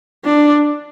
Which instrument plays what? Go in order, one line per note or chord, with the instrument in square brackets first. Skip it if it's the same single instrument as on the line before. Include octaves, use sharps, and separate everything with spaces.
[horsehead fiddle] D4